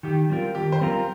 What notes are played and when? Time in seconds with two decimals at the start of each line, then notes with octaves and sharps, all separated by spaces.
0.03 D#3 G4
0.30 G3 C4 F4 A#4
0.55 D#3 G4
0.72 C5
0.81 G3 C4 F4 A#4